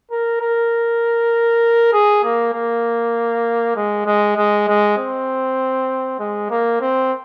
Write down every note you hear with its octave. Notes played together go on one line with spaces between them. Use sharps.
A#4
A#4
G#4
A#3
A#3
G#3
G#3
G#3
G#3
C4
G#3
A#3
C4